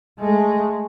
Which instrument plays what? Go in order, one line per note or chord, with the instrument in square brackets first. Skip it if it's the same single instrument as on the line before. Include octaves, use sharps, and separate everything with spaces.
[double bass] G#3 A3